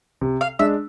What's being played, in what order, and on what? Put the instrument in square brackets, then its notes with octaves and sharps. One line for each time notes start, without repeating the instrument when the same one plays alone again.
[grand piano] C3
[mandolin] F5
[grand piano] G#3 D4 [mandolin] E5